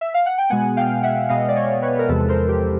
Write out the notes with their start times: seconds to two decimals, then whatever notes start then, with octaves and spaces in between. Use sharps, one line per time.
0.01 E5
0.14 F5
0.26 F#5
0.38 G5
0.50 B2 G#3 B3 F#5 G#5
0.77 F5 G5
1.03 E5 F#5
1.29 B2 G#3 B3 D#5 F5
1.48 D5
1.56 C#5 D#5
1.82 B4 C#5
1.99 A#4
2.09 E2 C3 F3 G#3 A4 B4
2.28 A#4 C5
2.48 G4